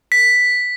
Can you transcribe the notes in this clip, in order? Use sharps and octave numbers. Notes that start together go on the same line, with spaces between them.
B6